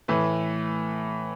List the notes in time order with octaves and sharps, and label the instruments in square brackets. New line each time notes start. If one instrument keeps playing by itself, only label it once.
[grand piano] A2 E3 A3 B4